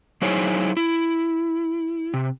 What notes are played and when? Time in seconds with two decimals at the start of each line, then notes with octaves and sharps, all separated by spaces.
0.22 F#3 D#4 E4 G#4 C5 C#5
0.77 E4
2.14 C3